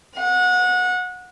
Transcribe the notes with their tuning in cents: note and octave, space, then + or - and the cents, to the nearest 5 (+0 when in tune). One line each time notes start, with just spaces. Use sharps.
F#5 -25